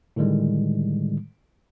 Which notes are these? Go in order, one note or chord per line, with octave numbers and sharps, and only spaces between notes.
A2 D3 D#3 G3 G#3